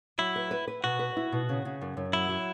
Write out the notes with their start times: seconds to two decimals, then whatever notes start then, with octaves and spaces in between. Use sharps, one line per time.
0.18 F#3 E4
0.36 B4
0.51 B4
0.68 B4
0.84 B2 F#4
0.99 B4
1.17 E4
1.32 B2
1.49 C#3
1.65 C#3
1.81 F#2
1.97 F#2
2.13 F#3 E4
2.29 F#3